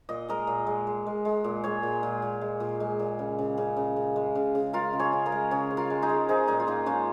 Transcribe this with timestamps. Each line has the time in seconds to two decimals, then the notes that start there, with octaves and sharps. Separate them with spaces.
0.09 A#2 D#5
0.28 G#3 A#4 D#5
0.47 A#2
0.67 G#3
0.87 G#3
1.06 G#3
1.25 G#3
1.44 A#2
1.64 G#3 G#4 C#5
1.83 A#2
2.03 A#2
2.22 A#2
2.41 G#3
2.60 A#2
2.80 G#3
2.99 A#2
3.19 C#3
3.39 C#3
3.58 C#3
3.77 C#3
3.96 C#3
4.16 G#3
4.35 C#3
4.55 C#3
4.73 G#3 F4 A#4
4.93 C#3
5.00 G#4 C#5
5.13 C#3
5.26 A#4 D#5
5.32 G#3
5.51 C#3 G#4 C#5
5.71 C#3
5.77 F4 A#4
5.90 G#3
6.02 D#4 G#4
6.09 G#3
6.29 F3 D#4 G#4
6.48 A#2 D#4 G#4
6.60 F4
6.67 A#2 A#3 D#4
6.86 G#3 C#4 F4